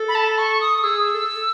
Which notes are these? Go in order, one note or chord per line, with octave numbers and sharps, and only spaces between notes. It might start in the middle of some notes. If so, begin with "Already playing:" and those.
Already playing: A4
B5
A5
C#6
D#6
G#4 E6
A4